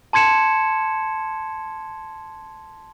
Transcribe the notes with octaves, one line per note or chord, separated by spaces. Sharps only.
A5 C6 G#6 C#7 E7